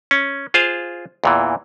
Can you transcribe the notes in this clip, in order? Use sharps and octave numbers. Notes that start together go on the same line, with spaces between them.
C#4
F4 G#4 C5 F5
E2 A#2 E3